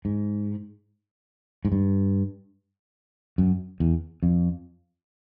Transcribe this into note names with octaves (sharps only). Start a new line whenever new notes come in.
G#2
G#2
G2
F#2
E2
F2